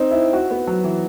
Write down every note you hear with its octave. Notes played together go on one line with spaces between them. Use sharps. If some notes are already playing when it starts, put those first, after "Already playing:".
Already playing: C4 D#4
E4
F#4
B3
F#3
E3